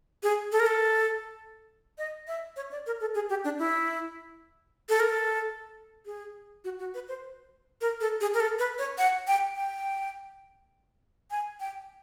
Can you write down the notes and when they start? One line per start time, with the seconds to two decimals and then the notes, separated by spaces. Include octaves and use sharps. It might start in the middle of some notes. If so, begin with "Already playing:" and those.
0.23 G#4
0.52 A4
0.60 A#4
0.66 A4
1.98 D#5
2.28 E5
2.56 C#5
2.71 D5
2.86 A#4
3.00 A4
3.15 G#4
3.29 G4
3.44 D4
3.59 E4
4.89 A4
5.00 A#4
5.09 A4
6.06 G#4
6.64 F#4
6.79 F#4
6.94 B4
7.08 C5
7.81 A#4
8.00 A4
8.21 G#4
8.34 A#4
8.40 A4
8.59 B4
8.78 C#5
8.98 F#5
9.27 G5
9.56 G5
11.31 G#5
11.60 G5